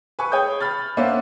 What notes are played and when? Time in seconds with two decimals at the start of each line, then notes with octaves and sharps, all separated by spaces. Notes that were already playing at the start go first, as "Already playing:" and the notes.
0.19 B4 G#5 C#6
0.32 G#4 C#5 G5 D#6 G6
0.61 B5 F6 A6
0.97 A#3 B3 C#4 D4 C5 E5